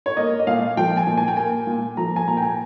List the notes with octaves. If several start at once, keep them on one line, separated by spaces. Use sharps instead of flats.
C#5
A#3 D#5
D#5
A#2 F5
F3 G5
G#5
A#2
G#5
G5
A#3 G#5
A#2
F3 A#5
G#5
A#2 A#5
G5
G#5